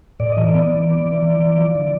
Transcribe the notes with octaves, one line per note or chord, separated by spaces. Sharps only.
A2 D5
E3 D#5
D5
B3
E3
B3
E3
E3
E3
F3
D3